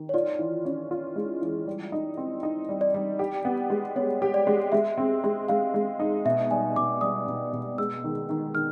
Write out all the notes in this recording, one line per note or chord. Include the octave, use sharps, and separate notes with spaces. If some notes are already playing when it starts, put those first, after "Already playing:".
Already playing: D#3
C#5
F4 D5
E3
C#4
F4
G#3
E3
G3
D#4
C4
D#4
G3
D5
G3
G4
B3
G#3
B3 C#5
G4
D5
G#3
G#3 E5
C4
G#3
G#3 F5
G#3
D#4
B2 E5
G3 G#5
B2 D6
G3 D#6
B2
B2
G#3 E6
D#3
D#3
D#3 F6